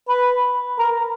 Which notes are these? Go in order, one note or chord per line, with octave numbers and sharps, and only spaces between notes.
B4
A#4